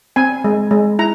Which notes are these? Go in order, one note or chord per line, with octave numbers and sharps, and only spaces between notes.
C4 G#5
G#3
G#3
E4 A#5